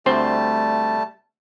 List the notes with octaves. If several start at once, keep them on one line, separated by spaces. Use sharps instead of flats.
D2 G3 A3 C4 C5 A5